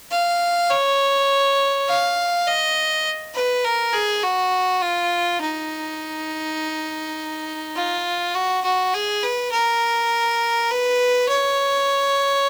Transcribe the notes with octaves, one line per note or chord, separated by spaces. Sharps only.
F5
C#5
F5
D#5
B4
A#4
G#4
F#4
F4
D#4
F4
F#4
F#4
G#4
B4
A#4
B4
C#5